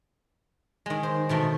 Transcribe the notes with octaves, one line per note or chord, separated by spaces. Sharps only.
D#3 G#3
C5
B2 D#3 A3